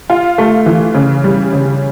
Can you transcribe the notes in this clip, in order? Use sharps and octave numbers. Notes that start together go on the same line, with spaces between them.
F4
A3
E3
C#3
G3
C#3